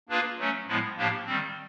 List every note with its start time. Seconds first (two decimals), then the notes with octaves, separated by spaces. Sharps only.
0.09 A#3 D4 F4 G#4 B4
0.39 F#3 A3 C#4
0.68 A2 F3 G#3 B3 E4
0.96 A2 F3 A#3 D4 G4
1.26 D#3 G3 C4